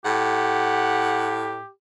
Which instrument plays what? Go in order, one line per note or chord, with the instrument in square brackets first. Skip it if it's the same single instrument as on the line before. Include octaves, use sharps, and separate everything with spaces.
[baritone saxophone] A2 [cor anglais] G4 [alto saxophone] F#5